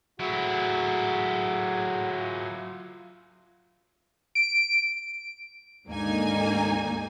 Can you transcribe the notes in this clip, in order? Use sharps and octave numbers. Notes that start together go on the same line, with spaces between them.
A2 F#3 E4 F#4 G#4
F4
D7
D#2 G#2 D3 A#3 D#4 G#5